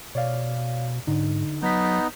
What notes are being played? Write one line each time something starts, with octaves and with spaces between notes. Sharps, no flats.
B2 C#5 D5 F5
G#2 D3 D#4
F#3 B3 D#4 G6 B6